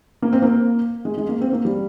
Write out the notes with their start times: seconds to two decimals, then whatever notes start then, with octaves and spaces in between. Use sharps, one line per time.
0.22 A#3
0.33 C4
0.42 A#3
1.05 G#3
1.18 G#3
1.29 A#3
1.41 C4
1.53 A#3
1.65 G3